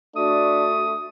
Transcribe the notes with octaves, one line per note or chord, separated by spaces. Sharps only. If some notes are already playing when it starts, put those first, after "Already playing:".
A3 D4 F#4 D#6